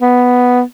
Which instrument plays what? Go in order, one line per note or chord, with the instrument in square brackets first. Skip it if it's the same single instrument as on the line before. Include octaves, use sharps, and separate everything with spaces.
[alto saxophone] B3